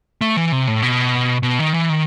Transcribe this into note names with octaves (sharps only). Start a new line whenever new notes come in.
A3
E3
C3
A2
B2
B2
D#3
E3
D#3